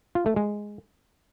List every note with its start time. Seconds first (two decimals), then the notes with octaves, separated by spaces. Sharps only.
0.15 F4
0.26 A3
0.36 G#3